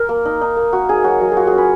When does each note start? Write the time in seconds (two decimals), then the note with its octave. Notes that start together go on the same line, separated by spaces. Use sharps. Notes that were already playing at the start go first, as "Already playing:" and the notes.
Already playing: A#4
0.09 A#3
0.25 D#4
0.41 D#4
0.57 A#3
0.73 A#3 F#4
0.89 D#4 G#4
1.04 F#3 F#4
1.21 F#3
1.32 G#4
1.37 F4 F#4
1.47 G#4
1.52 C#4
1.58 B4